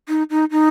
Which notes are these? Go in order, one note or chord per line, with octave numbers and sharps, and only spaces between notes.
D#4
D#4
D#4